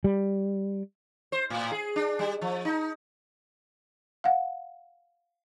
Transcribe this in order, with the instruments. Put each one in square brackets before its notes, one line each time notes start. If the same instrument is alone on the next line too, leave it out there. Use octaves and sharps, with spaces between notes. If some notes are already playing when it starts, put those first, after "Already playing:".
[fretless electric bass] G3
[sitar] C5
A2
G#4
D4
G3
F3
D#4
[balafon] F5 F#5